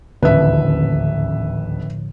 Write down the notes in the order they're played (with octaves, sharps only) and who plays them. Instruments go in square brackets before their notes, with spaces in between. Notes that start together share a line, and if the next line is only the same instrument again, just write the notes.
[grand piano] D#1 A1 D2 [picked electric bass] A2 D3 F3 [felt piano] B4 E5